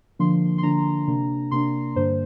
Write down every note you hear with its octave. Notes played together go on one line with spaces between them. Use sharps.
D3 F3 A#3 D4 C6
C6
D3 F3 A#3 D4 A#5
C3 A#3 D4
C3 A#3 D4 C6
G2 D3 A#3 D4 C5